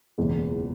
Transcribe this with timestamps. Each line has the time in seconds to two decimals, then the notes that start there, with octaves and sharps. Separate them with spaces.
0.18 F#1 E2 B2 G#3